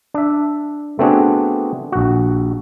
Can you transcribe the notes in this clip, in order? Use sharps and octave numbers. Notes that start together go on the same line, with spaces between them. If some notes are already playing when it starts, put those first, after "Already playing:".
D4 E5
A3 B3 C4 D4 F#4 G#4
A#1 F#4